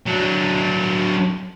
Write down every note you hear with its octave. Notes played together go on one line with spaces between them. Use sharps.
F#3 D4